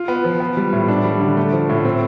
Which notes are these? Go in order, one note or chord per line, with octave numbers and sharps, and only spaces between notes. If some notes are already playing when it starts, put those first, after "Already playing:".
Already playing: F4
B3
F3
B3
G3
A2
D4
G3
D3
A3
F3
A2
C4